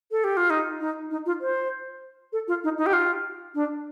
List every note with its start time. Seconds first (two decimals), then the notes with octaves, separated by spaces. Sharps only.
0.11 A4
0.24 G4
0.37 F4
0.50 D#4
0.80 D#4
1.11 D#4
1.26 F4
1.41 C5
2.33 A4
2.48 F4
2.64 D#4
2.78 D#4
2.86 G4
2.93 F4
3.55 D4